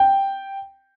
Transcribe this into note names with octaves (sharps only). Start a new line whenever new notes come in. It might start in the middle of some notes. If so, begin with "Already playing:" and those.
Already playing: G5